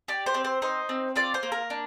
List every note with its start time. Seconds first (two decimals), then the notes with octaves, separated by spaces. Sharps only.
0.08 G4 D5
0.26 C5
0.34 C4
0.45 C5
0.62 D#4 C5
0.89 C4
1.16 F4 D5
1.34 C5
1.43 A#3
1.52 A#4
1.70 D4